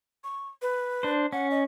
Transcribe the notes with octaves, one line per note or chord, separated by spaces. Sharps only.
C#6
B4
D4 C5
C#4 F#5
D#5